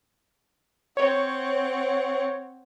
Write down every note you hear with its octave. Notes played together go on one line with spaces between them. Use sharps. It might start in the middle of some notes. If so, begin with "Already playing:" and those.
C4 C#5 F#5